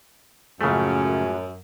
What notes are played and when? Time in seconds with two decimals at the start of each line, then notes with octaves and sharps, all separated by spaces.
0.61 F#2 A2 C#3 F3 G#3 A3 C#4